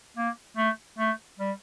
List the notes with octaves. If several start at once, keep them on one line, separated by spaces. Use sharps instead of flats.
A#3
A3
A3
G3